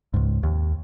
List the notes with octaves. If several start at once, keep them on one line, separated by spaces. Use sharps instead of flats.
C#2 G#2
D#2